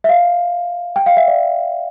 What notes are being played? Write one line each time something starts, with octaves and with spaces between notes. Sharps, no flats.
E5
F5
G5
F5
E5
D5